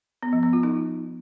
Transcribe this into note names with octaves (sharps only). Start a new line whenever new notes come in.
B3
F3
B3
F4
D#4